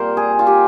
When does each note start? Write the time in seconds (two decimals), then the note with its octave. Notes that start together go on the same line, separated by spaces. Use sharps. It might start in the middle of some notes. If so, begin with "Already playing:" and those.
Already playing: A#2 G3 A#3 C4 A#4 C5
0.17 G#4
0.39 F4
0.47 G4